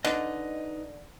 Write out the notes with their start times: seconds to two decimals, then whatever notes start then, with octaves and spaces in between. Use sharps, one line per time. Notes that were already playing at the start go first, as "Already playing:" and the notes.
0.05 D3 D#4 B4 D#5